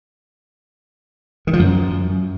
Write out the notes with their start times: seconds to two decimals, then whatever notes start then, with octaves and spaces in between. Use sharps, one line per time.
1.47 D#3
1.53 F3
1.59 F#2